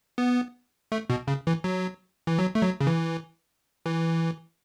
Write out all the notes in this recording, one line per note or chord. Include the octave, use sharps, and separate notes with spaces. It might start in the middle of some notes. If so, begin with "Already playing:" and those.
B3
A3
B2
C#3
E3
F#3
E3
F#3
A3
F#3
C#3
E3
E3